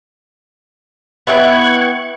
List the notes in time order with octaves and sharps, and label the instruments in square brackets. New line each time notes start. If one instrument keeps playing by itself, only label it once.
[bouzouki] B3 E4 G5 [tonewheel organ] C#6 F#6 G#6